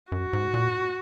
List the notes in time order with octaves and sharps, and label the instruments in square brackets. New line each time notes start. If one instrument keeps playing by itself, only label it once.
[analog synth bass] F#2 [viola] F#4
[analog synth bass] G#2
A#2